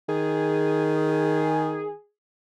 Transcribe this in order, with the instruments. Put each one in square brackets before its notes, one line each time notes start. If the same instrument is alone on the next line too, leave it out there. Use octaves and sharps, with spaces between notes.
[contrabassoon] D#3 [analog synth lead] G#4